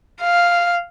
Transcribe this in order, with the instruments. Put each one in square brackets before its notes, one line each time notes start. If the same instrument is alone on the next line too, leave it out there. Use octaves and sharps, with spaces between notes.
[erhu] F5